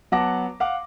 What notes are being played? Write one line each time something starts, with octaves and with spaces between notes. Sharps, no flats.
F#3 B3 F#5 A5 D6 A#6
F5 F#5 D6